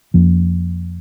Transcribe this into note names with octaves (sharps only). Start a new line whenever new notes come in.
F2 F3 A#3 C#4